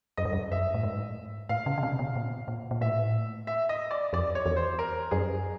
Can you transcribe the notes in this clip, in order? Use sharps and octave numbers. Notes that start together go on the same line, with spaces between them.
F#2 D#5
G2
F#2
F#2 E5
A2
G#2
A2 F5
C#3
C#3
C3
B2
A#2
A#2
A#2
A2 E5
E5
D#5
D5
F2 D5
C#5
E2
C5
A#4
F#2 G#4